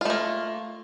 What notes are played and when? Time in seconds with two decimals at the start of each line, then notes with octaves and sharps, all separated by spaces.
0.01 F4
0.05 A3
0.10 A#3